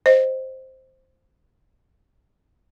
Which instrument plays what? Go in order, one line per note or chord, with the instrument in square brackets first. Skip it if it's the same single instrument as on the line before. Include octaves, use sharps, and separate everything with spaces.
[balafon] C5 D#5